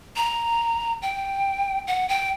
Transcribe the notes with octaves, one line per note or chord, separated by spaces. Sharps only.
A#5
G5
F#5
G5